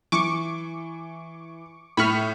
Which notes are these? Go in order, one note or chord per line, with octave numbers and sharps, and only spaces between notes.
E3 C#6 D6
A2 B5 C#6 F6 B6